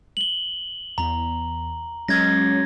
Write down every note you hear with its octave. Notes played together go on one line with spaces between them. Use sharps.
F#7 G7
E2 A#5
F#3 G#3 C#4 G#6 A#6